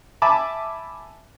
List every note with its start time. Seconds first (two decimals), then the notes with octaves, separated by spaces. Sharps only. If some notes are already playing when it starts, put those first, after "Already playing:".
0.22 E5 G#5 A5 B5 D6